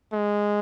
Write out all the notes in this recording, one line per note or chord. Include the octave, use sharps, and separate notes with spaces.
G#3